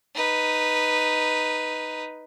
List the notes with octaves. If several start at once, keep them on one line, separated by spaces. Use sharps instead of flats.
D#4 B4